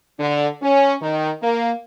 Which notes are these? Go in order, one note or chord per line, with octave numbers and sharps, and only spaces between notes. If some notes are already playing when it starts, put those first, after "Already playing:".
D3
C#4
D#3
A#3